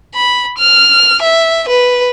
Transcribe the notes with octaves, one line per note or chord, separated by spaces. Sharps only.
B5
F6
E5
B4